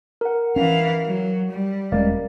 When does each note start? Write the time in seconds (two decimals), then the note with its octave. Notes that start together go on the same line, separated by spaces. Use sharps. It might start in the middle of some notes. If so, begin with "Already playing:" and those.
0.21 A#4 F#5
0.56 E3 C#4 F5
1.05 F#3
1.51 G3
1.92 E1 G#3 C#4 A#4 D5 F5